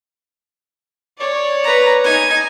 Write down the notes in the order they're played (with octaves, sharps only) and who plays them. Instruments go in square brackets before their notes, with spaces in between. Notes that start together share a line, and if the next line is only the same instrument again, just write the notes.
[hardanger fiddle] C#5 D5
[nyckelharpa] B4 A#5
[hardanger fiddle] D#4 [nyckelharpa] G#5